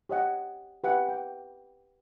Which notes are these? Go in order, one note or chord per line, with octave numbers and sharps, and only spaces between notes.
G4 C#5 D#5 F#5
G4 B4 E5 F#5
G5